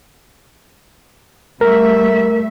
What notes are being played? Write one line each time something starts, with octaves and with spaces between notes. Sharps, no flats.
G3 A3 A#4 E5